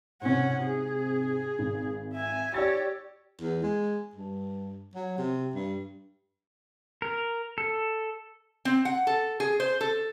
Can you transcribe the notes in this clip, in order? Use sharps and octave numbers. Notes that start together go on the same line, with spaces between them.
G#2 C3 C#4 F#5
G#4
G#1
E5 G#5
G4 C#5 D5 E6 A6
E2
G#3
G2
F#3
C3
G2
A#4
A4
C4
F#5
A4
G#4
C5
A4